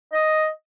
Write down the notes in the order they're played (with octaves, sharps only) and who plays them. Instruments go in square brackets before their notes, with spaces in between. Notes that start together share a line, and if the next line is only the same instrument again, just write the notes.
[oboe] D#5